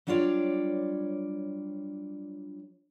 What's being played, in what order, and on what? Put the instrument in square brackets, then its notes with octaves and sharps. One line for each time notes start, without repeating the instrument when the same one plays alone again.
[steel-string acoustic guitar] F#3 G3 D4 F4 C#5 D5